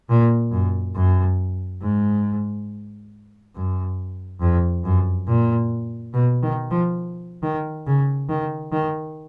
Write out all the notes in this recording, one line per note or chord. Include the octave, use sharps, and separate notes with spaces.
A#2
F#2
F#2
G#2
F#2
F2
F#2
A#2
B2
D#3
F3
D#3
C#3
D#3
D#3